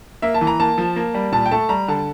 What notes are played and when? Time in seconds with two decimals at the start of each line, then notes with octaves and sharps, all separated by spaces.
0.22 A#3 E5
0.34 A5
0.41 E3
0.47 A#5
0.60 A#3 A5
0.78 F3
0.96 A#3
1.14 G3
1.32 A#2 A5
1.46 G5
1.51 A3 A5
1.69 G3 A#5
1.88 D3 A5